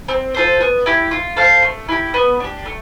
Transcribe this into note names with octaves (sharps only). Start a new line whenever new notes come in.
C4
F4 A4 C5
B3
E4 G4
F4
A4 C5 F5
A3
E4 G4
B3
D4 G4
A3